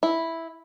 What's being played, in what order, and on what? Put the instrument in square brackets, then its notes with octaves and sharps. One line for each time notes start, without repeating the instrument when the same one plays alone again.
[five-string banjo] E4